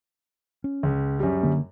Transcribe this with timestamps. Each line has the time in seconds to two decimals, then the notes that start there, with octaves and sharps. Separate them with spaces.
0.64 C#4
0.83 C#2
1.19 F#2 G3
1.43 D3 A#3